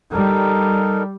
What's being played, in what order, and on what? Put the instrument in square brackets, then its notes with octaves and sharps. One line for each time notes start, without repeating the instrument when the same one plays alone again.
[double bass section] G3 [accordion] D#4 A4 A#4